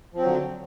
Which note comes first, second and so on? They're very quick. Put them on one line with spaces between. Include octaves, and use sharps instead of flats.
F3 C4 F#3 D3